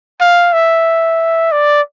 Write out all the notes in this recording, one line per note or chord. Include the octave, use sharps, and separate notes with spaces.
F5
E5
D5